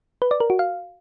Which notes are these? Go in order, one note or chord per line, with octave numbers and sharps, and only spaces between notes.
B4
D5
A#4
F#4
F5